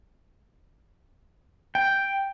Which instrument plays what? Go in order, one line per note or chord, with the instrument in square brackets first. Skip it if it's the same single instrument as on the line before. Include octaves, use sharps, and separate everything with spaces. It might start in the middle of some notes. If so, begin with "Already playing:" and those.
[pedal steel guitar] G5